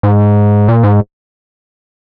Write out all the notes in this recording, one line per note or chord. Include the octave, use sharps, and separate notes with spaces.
G#2
A#2
G#2